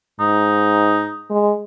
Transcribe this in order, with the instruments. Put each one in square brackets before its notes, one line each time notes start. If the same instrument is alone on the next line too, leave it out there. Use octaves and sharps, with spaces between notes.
[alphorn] G#2 [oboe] D#4
[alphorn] G#3